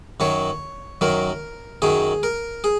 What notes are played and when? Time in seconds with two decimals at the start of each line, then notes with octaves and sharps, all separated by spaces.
0.20 F#2 D#3 F#3 C#5
1.01 F#2 D#3 F#3 A#4
1.82 F#2 D#3 F#3 G#4
2.23 A#4
2.64 G#4